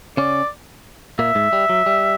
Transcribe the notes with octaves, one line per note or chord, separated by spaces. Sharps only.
C#3 C#4 D5
A#2 A#3 E5
G#2 G#3
G3
F#3
G3